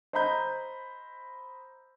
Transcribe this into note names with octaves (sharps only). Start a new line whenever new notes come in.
C5 D#5 A#5 B5 G6